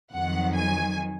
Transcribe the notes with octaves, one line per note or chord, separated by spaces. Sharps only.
F2 D#3 F#3 F#5
G#5